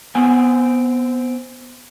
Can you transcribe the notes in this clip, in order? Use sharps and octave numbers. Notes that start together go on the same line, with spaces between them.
B3 C4 G#5